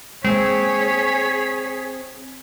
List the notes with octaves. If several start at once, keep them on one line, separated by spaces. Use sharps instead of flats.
G#3 A#3 C4 G#4 C#5 B6